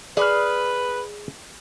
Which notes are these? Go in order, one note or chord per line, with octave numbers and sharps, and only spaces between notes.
G#4 B4 D5 B5 F6